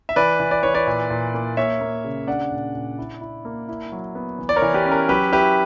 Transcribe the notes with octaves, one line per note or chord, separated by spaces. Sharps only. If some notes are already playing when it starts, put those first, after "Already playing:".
E5
E3 B4 D5
E3
D5
E3 C#5
B4 D5
A#2
A#2
A#3
A#3 C#5 E5
A#3
C#3
D4 D5 F#5
A#2
A#2
E4
E4
A#3
E4
F#3
B3
E3
D5
A#4 C#5
E3
G4 B4
C#4
A#4
F#3 G4 B4
E4 G4 B4